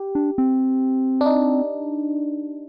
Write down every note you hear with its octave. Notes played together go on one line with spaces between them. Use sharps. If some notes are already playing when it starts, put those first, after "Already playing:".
Already playing: G4
D4
C4
D4
D#4